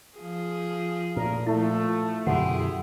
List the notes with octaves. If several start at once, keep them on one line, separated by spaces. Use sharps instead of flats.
F3 G#4
A#2 A3 A#3 A#4
F3 A3 E4
F#2 B2 D3 E4 G4 G#4 F#5 C6